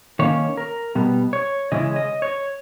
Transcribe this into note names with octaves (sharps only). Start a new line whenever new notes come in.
D#3 A#3 C#4 C#5
A#4
B2 G3 B3
C#5
C#3 E3 G#3 C#4 E4 D#5
D#5
C#5